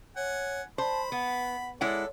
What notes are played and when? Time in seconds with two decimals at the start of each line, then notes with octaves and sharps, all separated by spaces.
0.17 C#5 F#5 G#5
0.78 C5 A5 B5
1.12 B3 F#5
1.81 G#3 E4 A4 C#5 D5 F#5